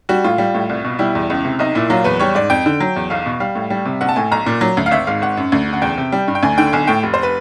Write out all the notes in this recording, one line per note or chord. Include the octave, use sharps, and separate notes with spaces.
G3 F#4
A2 F4
G3
A2
C2
B2
G3 E4
E2
C#2
C3
B1 D#4
A#2 E4
F#3 F4
E2 B4
G3 C#5
G#2 D5
F2 G5
D3
F#3
E2
B1 F5
B2
G3 F5
A2
G3
C3
A#1 F#5
A5
A2 G#5
B1 A#5
A#2
F#3
D2
F5
G#1 E5
G#2 F5
G#1 F#5
F#2
D2
C#3
F#5
E2 G5
C3
G3
G2
G5
D2 G#5
D3 G5
B1 G#5
A2 G5
F1
C5
B4